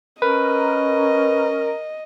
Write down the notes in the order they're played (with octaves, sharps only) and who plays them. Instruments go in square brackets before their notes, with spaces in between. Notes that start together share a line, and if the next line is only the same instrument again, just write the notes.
[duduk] C#4 [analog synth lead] A#4 [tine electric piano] B4 [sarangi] D#5